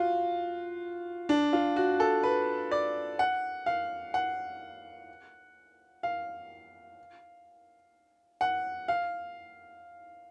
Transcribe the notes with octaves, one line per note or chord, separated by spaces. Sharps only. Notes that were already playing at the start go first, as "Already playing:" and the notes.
Already playing: F4 F#4
D4
F4
F#4
A4
B4
D5
F#5
F5
F#5
F5
F#5
F5